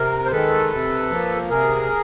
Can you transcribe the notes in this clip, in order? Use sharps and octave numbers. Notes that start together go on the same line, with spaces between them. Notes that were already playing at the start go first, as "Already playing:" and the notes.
Already playing: C3 A#4
C5
D#3 G#3 A4 B4
C3
F3 A#3
C3 G#4 A#4